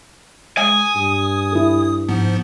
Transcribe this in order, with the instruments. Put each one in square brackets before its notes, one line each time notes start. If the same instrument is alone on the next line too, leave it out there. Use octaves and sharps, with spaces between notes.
[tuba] G#3 [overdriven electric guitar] G#5 [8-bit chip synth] D#6
[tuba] G2
[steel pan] E4 A4
[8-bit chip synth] G#2 F3 B3